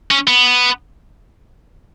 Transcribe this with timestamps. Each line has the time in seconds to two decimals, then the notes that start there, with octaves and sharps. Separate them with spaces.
0.11 C#4
0.28 B3